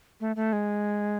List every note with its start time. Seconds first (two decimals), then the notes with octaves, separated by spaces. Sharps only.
0.20 A3
0.36 A3
0.53 G#3